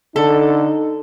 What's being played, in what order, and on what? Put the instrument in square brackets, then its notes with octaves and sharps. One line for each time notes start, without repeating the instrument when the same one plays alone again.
[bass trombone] D3 [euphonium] D#4 [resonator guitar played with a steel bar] A4